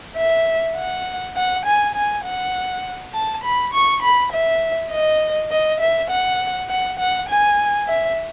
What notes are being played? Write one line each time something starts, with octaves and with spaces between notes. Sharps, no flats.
E5
F#5
F#5
G#5
G#5
F#5
A5
B5
C#6
B5
E5
D#5
D#5
E5
F#5
F#5
F#5
G#5
E5